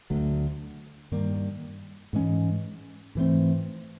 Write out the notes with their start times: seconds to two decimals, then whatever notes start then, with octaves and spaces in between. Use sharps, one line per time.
0.10 D2 D3 F#3 A3
1.12 G2 D#3 G3 A#3
2.13 G#2 E3 G#3 C#4
3.15 G#2 E3 A3 C4